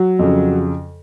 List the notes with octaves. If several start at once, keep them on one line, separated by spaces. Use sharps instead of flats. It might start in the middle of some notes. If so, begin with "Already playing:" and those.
Already playing: F#3
F2 C#3